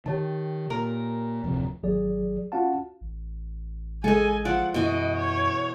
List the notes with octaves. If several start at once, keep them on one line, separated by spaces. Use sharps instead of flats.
D#3 G4 C#5 A5
A#2 A#4
D1 F2 C3
G#1 F#3 G#4 D5
C#4 F4 F#4 F5 F#5 A5
A1
G#3 A4 D#5 G#5
F3 D5 F#5
F#2 B2 E3 D#5
C#5